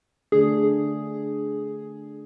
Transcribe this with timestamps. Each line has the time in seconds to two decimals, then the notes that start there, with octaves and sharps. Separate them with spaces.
0.32 D3 A3 D4 G#4